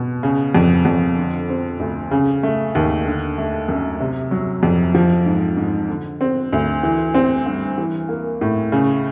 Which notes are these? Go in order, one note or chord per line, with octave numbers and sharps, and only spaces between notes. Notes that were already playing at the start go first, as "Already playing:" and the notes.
Already playing: B2
C#3
F2
F2
D3
C4
D2
C#3
A3
D#2
D3
A3
F#2
C3
F#3
F2
F3
G#2
G#2
D3
C4
D2
E3
C4
G2
E3
A#3
A2
C#3